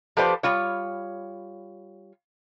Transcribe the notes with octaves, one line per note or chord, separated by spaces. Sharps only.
F3 G4 A4 B4 C5 D5
G3 F4 C#5